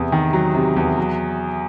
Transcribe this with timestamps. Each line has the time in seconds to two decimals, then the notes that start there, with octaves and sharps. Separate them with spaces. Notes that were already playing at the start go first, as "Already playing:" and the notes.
Already playing: E2 C3
0.12 D#3
0.33 F#3
0.55 C3
0.76 E2
0.98 F#3